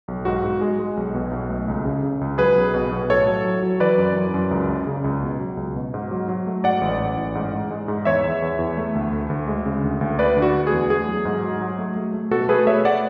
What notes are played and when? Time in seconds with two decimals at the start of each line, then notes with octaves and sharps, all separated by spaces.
0.08 B1
0.25 G#2 F#4
0.44 G#2
0.61 G#3
0.79 G#3
0.97 B1
1.14 B2
1.31 B1
1.49 A3
1.68 C#2
1.85 C#3
2.03 C#3
2.21 C#2
2.38 F#3 G#4 B4
2.56 B1
2.74 B2
2.91 B1
3.09 A2 A4 C#5
3.27 F#3
3.45 F#3
3.62 F#3
3.80 E3 B4 D5
3.98 F#2
4.16 F#2
4.34 F#2
4.51 C#2
4.69 C#3
4.87 C#3
5.04 C#2
5.22 B2
5.40 F#3
5.57 C#2
5.75 B2
5.94 G#2
6.11 F#3
6.28 F#3
6.47 A3
6.64 G#2 D5 F#5
6.81 A1
7.00 A1
7.17 A1
7.35 G#2
7.52 G#2
7.71 G#3
7.88 G#2
8.05 E2 C#5 E5
8.24 E2
8.42 E2
8.59 E2
8.77 A3
8.95 D2
9.13 D2
9.30 D2
9.48 G#3
9.66 C#3
9.84 D2
10.01 D2
10.18 A3 B4 D5
10.37 D3
10.42 F#4
10.54 A3
10.67 G#4
10.72 E2
10.90 A3 G#4
11.07 F#3
11.25 G#2
11.43 F#3
11.61 F#3
11.79 A3
11.96 A3
12.14 A3
12.31 B2 F#4 A4
12.49 A3 G#4 B4
12.67 A3 C#5 E5
12.85 A3 D5 F#5